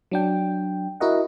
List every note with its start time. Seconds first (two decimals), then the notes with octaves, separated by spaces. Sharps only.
0.11 F#3 D4 G5
1.00 E4 F#4 A#4 D#5 F#5